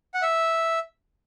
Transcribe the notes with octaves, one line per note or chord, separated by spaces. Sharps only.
F#5
E5